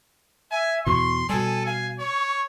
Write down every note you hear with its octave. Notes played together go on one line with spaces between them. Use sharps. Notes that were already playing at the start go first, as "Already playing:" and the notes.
E5 G#5
E2 B2 C6 C#6
B2 G3 A4 G#5
F5 G#5
C#5 C#6